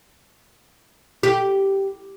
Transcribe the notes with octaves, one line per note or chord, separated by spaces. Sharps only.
G4